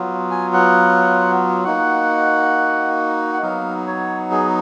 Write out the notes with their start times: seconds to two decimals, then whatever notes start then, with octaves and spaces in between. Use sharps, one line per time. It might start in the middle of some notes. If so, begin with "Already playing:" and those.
Already playing: F#3 B3 F4
0.31 G#5
0.54 F#5
1.64 A#3 D#4 F#4 F#5
3.33 F#5
3.42 F#3 B3 D#4 F5
3.87 C#5
4.32 G#4